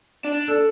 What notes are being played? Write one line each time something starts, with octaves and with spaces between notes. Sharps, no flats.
D4
A4